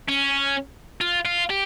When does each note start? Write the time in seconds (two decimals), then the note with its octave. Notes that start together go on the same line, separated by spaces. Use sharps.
0.08 C#4
1.01 F4
1.25 F4
1.50 G4